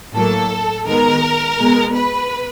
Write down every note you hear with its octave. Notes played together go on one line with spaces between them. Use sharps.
A2 F#3 A#3 A4
D#3 G#3 B3 A#4
B2 G#3 B3
B4